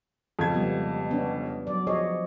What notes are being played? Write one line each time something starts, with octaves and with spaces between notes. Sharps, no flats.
F2 C#3 G#6
G3 G#3 B3
B3 C#4 D4
F#3 D5
F3 G#4 C#5 D#5